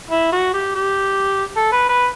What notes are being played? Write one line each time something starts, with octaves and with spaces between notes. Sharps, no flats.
E4
F#4
G4
G4
A4
B4
B4